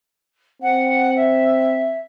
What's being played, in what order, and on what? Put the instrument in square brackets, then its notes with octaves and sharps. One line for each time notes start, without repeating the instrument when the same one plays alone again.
[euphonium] C4 [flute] F#5
[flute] E5